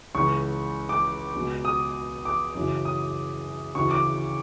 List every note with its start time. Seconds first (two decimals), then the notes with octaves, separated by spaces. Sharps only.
0.15 C#2 C#3 E3 C#6
0.89 D6
1.35 C#2 B2
1.65 D#6
2.25 D6
2.55 F#2 C#3 E3
2.85 D#6
3.75 D2 C#3 E3 C#6
3.91 D6